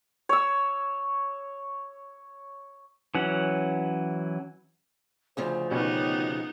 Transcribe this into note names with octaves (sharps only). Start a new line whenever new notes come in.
C#5 E6
E3 F#3 C#4 F#5
D2 C#3 F3 C5
B2 B3 C#4 D#4 G4